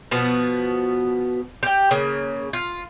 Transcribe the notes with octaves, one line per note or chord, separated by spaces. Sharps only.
B2 F3 B3 F#4
G4 G5
C#3 A#3
F4